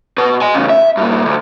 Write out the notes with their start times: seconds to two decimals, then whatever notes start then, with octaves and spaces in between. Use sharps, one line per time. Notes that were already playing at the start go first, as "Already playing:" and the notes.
0.18 B2 B4
0.42 D#5 G#5
0.54 E2 C#3
0.69 E5
0.97 G2 A#2
1.25 D2